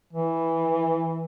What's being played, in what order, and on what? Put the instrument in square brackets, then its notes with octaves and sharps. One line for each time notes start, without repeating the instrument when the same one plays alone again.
[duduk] E3